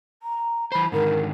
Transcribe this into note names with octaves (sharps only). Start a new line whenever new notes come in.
A#5
E3 C5 B5
G#2 D3 D#3 A#4